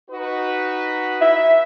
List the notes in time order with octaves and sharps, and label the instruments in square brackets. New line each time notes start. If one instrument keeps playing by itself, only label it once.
[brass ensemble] D#4 F#4 B4
[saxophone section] E5